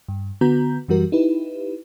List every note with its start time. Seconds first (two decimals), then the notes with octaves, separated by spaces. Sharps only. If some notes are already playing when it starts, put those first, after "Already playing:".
0.08 G2
0.41 D3 B3 F#4 A#5 G6
0.88 F#2 E3 G3 F#4 A#4
1.12 D#4 E4 G4 B4